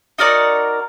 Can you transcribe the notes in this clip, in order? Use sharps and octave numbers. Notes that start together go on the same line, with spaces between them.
D#4 F#4 A#4 D5